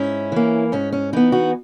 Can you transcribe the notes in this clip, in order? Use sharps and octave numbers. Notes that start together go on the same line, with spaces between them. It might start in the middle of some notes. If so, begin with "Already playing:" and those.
Already playing: G#2 C#4 E4
E3 A#3
G#2 C#4
C#4
E3 B3 D#4
D#4 F#4